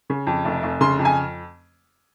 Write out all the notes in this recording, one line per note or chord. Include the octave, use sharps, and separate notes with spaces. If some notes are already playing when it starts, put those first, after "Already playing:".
C#3
F2
F1
F1
C#3 C6
F2
G#5